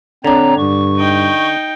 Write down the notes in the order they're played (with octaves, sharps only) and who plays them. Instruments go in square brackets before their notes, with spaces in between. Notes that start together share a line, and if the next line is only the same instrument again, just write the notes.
[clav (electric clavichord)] D3 D4 [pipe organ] C4 C#5 A#5
[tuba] G2 [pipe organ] C#6
[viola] D#4 G5